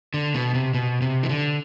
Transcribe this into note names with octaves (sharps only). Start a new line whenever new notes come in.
D3
B2
C3
B2
C3
E3
D3